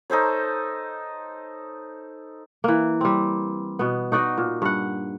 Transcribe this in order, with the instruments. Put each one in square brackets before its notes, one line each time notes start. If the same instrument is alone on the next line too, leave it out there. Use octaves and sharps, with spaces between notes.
[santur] D#4 A4 C5 C#5
[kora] E3 A#3
G3 C4
B2 B3
D#4 F#4 D5 D#5
A#2
G2 F#5